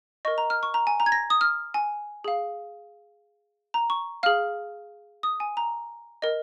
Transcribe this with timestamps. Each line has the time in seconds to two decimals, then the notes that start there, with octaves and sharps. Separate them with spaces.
0.25 A#4 D#5 C#6
0.38 A#5
0.50 F6
0.63 C#6
0.74 A#5
0.87 G#5
1.00 A#5
1.06 G#6
1.12 A#6
1.30 D#6
1.41 F6
1.74 G#5
2.24 G#4 F5
3.74 A#5
3.90 C#6
4.23 G#4 F5 F6
5.23 D#6
5.40 G#5
5.57 A#5
6.22 A#4 D#5